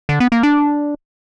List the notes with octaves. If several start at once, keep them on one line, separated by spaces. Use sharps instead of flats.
D3
B3
A#3
D4